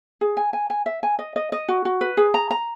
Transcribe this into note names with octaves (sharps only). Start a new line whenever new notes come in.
G#4
G#5
G#5
G#5
E5
G#5
D#5
D#5
D#5
F#4
F#4
B4
G#4
A#5
A#5